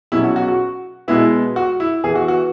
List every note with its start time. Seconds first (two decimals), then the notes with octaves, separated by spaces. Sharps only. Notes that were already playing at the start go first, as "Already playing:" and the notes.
0.12 B2 F#3 C#4 E4
0.24 F#4
0.36 F#4
0.48 F#4
1.08 B2 G#3 B3 E4
1.56 F#4
1.80 E4
2.04 E3 B3 G#4
2.15 F#4
2.28 F#4